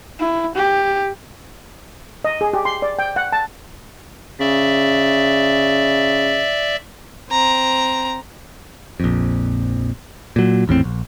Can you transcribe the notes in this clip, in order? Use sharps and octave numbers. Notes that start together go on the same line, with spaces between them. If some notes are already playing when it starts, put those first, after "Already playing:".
E4
G4
D#5
G#4
G4
C6
D5
G5
F#5
A5
C#3 D5 E5
C4 A#5
A#1 F2
A#2 F#3
G#1 E2 A2 C4
A#1